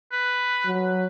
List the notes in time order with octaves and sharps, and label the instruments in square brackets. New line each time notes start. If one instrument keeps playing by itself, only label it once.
[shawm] B4
[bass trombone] F#3